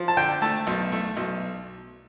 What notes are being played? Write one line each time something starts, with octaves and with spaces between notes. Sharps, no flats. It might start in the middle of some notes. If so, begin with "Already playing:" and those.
Already playing: F3
A5
D3 G5
A3 A5
B1
A3
B1